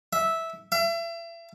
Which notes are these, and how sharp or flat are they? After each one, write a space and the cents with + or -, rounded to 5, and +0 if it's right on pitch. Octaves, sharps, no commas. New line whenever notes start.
E5 -10
E5 +35